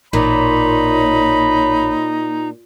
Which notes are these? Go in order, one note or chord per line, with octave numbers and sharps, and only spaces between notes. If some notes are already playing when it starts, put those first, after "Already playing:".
A1 A#2 D#4 C#5 B5